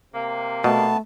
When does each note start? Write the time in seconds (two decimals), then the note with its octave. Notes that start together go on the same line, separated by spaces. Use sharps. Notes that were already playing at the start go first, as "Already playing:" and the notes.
0.13 C3 A#3
0.64 B2 A3 B3 A5